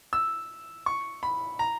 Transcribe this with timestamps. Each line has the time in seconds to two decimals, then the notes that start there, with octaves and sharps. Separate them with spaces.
0.13 E6
0.86 C#6
1.23 B5
1.59 A#5